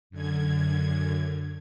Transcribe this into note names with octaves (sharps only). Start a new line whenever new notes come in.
F#2 D3 G#6